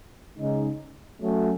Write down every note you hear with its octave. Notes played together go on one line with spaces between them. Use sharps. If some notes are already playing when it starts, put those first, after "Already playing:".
C#3 G#3 D#4
F#3 A3 C#4 F#4